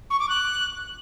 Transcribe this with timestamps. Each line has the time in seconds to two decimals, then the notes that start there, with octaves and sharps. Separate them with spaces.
0.10 C#6
0.19 D6
0.29 F#6